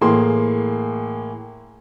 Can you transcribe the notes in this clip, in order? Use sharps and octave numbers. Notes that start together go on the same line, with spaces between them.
A2 E3 A#3 G#4 C6